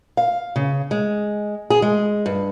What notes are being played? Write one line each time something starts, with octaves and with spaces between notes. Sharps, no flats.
F5
C#3
G#3
G#4
G#3
G2